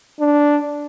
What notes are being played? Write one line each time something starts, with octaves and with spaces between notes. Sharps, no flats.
D4